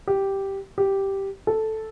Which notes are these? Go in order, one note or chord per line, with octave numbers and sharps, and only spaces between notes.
G4
G4
A4